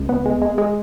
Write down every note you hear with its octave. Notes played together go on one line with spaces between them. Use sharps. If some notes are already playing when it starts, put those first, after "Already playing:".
Already playing: C#2
B3
G#3
G#3
G#3